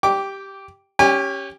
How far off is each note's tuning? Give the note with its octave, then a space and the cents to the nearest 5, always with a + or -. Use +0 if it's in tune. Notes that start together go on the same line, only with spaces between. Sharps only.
G4 +0 G5 +0 D6 -15
C#4 +0 G4 +0 G#5 -40